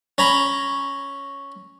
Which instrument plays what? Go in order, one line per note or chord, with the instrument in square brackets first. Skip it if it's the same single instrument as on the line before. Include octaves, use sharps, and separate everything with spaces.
[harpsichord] C#4 A#5 B5